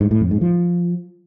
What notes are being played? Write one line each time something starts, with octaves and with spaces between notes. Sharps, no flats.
G#2
A2
F2
G#2
F3